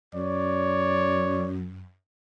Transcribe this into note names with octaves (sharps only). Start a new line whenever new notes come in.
F#2 C#5 D5